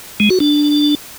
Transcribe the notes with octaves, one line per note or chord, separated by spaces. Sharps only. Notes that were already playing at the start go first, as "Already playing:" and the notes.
G#3
F#4
D4